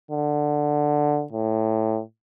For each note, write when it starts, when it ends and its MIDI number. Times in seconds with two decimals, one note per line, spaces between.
0.11 1.25 50
1.32 2.01 45